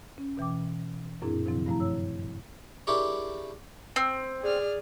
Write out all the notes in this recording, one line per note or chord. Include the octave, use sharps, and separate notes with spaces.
C#4
B2 E3 G5 D6
F#2 A#2 C4 D4 E4 G#4
C3 D#3 F3 F#3 C4 E4
G2 F3 A3 E4 A#5
C#5 E6
D4 E4 G4 G#4 A#4 C#5
C4
G#4 D5 F6